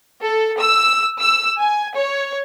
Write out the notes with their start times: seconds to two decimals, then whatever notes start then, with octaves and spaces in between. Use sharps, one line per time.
0.21 A4
0.58 E6
1.20 E6
1.60 G#5
1.94 C#5